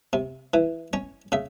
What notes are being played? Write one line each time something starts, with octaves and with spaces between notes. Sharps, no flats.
C3
E3
C#4 C#5
C#3 E5